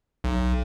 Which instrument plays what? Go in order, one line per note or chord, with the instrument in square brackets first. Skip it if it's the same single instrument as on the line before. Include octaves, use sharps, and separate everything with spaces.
[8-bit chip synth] B1